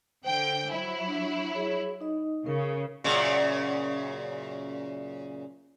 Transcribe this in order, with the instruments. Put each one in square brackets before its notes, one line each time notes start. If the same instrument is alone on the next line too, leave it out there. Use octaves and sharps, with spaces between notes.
[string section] D3 G5 [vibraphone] C5
[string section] F#3 E4
[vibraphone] D4
G#4 C#5
D#4 D#5
[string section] C#3 [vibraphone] A#4
[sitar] F#2 A#2 C#3